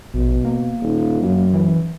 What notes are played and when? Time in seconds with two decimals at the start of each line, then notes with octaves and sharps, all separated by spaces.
0.14 A#1 B2
0.45 A#3
0.82 D#1
1.22 F#2
1.54 E3